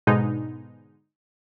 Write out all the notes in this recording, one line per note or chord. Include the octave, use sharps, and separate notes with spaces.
G#2 B2 D3 G#3 B3 D#4